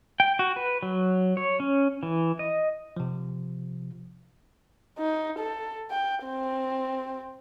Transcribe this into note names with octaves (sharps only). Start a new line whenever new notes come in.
G5
F#4
B4
F#3
C#5
C#4
E3
D#5
C3 F3
D#4
A4
G5
C4